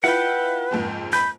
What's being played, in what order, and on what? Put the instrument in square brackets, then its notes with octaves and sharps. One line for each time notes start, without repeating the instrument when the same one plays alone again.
[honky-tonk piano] E4 F4 [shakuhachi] B4 [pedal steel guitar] F#5 G5
[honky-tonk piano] F#1 F2 G#2
[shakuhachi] B5 [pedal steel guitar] G6